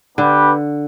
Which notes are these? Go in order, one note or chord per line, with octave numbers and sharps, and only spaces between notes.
D3 B3 D4 G4 B4